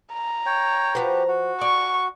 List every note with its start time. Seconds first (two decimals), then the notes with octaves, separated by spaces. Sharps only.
0.13 A#5
0.46 C#5 G5
0.95 F3 F#4 G4 B4 C5
1.28 F#4
1.61 D5 C#6